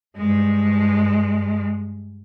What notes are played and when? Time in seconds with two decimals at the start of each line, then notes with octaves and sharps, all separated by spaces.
0.17 G2 G#3